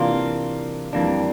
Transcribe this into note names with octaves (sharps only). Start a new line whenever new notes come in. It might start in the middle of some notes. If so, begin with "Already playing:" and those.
Already playing: C3 E3 A#3 D4 F4
F2 E3 G3 A#3 D4